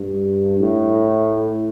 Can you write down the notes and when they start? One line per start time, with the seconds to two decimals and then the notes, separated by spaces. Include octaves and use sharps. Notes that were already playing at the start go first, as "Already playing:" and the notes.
Already playing: G2
0.60 A2